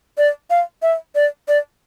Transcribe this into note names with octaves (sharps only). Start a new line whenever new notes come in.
D5
F5
E5
D5
D5